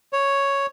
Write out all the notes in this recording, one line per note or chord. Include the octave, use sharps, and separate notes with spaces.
C#5